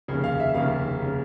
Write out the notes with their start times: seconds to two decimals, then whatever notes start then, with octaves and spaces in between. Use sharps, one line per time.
0.08 F1 D#2 C#3
0.24 F5
0.40 E5
0.55 F1 D#2 C#3 F5
1.02 C#3